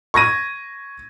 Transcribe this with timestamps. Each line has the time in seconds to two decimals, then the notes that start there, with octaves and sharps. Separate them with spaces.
0.14 C#6 G#6 A#6 D#7